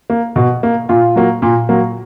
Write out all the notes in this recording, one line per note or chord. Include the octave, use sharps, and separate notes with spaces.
A#3
B2
A#3
A#2 F4
F#3 A#3
A#2
F#3 A#3